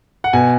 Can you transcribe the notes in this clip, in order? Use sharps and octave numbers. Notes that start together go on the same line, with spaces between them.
F#5
B2 G#5